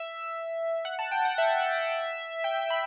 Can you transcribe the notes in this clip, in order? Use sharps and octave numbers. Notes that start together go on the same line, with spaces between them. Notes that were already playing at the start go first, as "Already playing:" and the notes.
Already playing: E5
F#5
A5
G5
F#5
E5
G5
B5